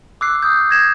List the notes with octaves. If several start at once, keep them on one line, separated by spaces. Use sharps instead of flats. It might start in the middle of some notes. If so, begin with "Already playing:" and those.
D6 E6 F#6 C7
D#6 G6
G#6 A#6 E7